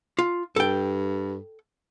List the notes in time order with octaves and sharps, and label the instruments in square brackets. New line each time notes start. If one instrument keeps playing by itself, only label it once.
[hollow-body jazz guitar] F4
[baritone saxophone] G2 [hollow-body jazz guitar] A4 G5